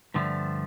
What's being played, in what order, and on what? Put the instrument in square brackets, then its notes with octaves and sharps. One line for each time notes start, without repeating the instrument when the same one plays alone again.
[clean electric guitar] G2 D3 F3 A3